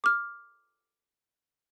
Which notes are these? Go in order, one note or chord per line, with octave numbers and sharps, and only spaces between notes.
D6 F6